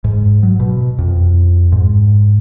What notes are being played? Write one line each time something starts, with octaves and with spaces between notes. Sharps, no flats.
G#2
F#3
B2
F2
G#2